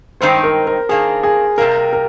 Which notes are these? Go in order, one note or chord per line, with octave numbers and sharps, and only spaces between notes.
G2 D#3 G#3 C4 D#4 C5
A#4
A#4
D#3 A#3 D4 G#4
G#4
C3 G3 A#3 A#4
A#4